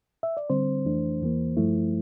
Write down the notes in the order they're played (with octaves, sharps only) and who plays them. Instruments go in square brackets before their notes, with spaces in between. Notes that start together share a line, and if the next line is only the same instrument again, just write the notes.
[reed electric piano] E5
D5
D3 G3 C4 C5
F2 E3 A3 D4
E2 E3 A#3
G2 F3 A3 E4